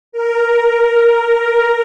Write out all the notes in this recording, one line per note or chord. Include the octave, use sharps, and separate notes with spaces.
A#4